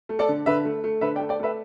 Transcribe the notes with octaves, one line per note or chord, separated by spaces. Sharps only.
A3
A4 D5
D3
D3 B4 E5
A3
A3
D3 B4 E5
D5 G5
A3
D5 G5
A3 B4 E5